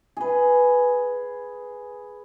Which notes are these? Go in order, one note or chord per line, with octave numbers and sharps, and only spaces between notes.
G#4 B4